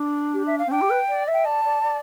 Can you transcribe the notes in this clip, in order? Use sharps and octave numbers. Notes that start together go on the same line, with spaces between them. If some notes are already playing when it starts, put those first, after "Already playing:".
Already playing: D4
G4
E5
F5
C4
D4 G5
G4
B4
D5
E5
G5
D5 A5
D5
D5